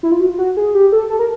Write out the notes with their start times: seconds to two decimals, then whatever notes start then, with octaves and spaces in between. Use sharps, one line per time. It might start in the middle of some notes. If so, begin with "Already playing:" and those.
0.03 E4
0.12 F4
0.20 F#4
0.29 F4
0.38 F#4
0.57 G#4
0.75 G4
0.92 A4
1.10 A4
1.19 A#4